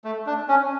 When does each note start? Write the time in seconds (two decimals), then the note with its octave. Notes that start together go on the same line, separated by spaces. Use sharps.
0.04 A3
0.26 D4
0.48 C#4